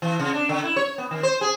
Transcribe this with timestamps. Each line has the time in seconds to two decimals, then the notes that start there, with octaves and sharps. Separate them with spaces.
0.02 E3
0.20 C#3
0.34 D4
0.49 D3
0.64 E4
0.76 C#5
0.98 B3
1.11 D#3
1.23 C5
1.41 G#4